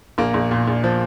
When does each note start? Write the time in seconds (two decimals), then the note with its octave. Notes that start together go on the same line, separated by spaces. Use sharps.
0.18 A#1 A#3
0.34 A#1
0.51 A#2
0.68 A#1
0.84 F3